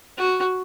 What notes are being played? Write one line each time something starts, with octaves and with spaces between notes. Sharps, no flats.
F#4